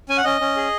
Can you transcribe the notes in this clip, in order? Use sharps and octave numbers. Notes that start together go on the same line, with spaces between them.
C#4 G#5
F#5
C#4 D#5
C#4
G#4